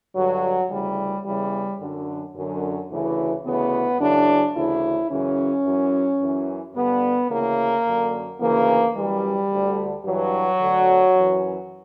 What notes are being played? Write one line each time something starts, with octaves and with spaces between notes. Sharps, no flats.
G2 D3 F#3
D2 C#3 E3 G3
E2 C#3 E3 G3
F#2 D3
F#2 D3
D2 C#3 E3
D2 C#3 E3 B3
F#2 C#3 E3 D4
D2 C#3 E3 E4
F#2 C#3 E3 C#4
F#2 E3
F#2 E3
G2 D3 B3
D2 C#3 E3 A#3
F#2 D3
D2 C#3 E3 A#3
F#2 E3 G3
D2 D3
G2 E3 F#3
D2 D3
F#2 E3